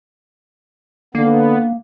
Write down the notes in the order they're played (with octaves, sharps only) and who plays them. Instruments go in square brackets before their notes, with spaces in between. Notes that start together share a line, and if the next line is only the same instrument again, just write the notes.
[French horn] D3 [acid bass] A#3 [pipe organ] B3